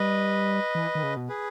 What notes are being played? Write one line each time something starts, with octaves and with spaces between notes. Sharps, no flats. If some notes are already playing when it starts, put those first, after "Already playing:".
Already playing: G3 B4 D#5
E3
D#3
C#3
B2
G#4 B4